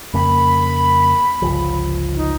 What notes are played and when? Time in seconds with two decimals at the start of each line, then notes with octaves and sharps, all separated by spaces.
0.14 F2 C#3 A#3 B5
1.42 G1 C#2 F3
2.15 D#4